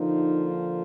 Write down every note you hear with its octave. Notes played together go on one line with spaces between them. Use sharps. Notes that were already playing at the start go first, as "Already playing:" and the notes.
Already playing: D3 F3 A#3 D#4